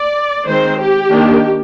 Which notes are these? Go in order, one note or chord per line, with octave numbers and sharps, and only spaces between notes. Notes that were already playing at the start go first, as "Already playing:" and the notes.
Already playing: D5
D#3 G#3 C4 C5
G4
D#3 A#3 D4